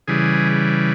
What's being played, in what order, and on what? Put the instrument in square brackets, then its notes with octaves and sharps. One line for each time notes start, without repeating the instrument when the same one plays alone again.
[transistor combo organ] C#3 E3 G3 G#4